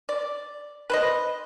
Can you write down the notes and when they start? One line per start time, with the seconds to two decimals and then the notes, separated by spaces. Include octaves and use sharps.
0.09 D5
0.90 B4 C5 D#5